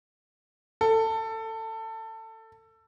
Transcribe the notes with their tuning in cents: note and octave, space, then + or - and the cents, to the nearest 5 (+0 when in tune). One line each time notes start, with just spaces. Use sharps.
A4 +20